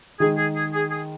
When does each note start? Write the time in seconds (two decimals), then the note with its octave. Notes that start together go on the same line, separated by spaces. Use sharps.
0.19 D#3 G#3 D#4 G#4
0.38 G#4
0.56 G#4
0.74 G#4
0.90 G#4